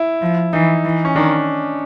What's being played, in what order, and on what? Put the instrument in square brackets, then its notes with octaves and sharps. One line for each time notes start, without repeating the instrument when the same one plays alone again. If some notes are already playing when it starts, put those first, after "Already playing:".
Already playing: [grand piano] E4
[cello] F3
[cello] E3 [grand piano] D#4
[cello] E3
[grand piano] C#4
[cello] D#3 [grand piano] D4